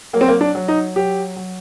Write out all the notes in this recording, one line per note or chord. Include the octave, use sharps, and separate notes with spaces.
F#3 A#3
C4
A#3
D4
F#3
D#4
F#3 G4
F#3